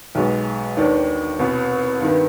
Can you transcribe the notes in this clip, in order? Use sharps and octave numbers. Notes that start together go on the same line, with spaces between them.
B1 B2 G#3
D#2 D#3 B3 D4
C2 B2 B3
G2 D#3 B3